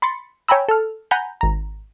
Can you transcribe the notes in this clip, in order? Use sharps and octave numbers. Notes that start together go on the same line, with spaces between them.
B5 C6 A6 C#7
C#5 G5 G#5 A#5 B5 E6
A4 F6
F#5 G#5 A#5 B5 G6
G#1 A#5